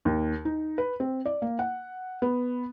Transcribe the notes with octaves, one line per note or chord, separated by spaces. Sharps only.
D#2
D#4
B4
C4
D5
A#3
F#5
B3